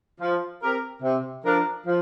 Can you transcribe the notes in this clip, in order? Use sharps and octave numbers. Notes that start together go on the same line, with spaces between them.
F3
C4 G4 A#4
C3
F3 D4 A#4
F3